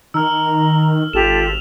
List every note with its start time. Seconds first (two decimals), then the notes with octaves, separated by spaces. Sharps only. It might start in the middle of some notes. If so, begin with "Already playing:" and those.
0.14 D#3 A#5 E6 F6
1.13 G#1 F4 G4 A4 E7 F7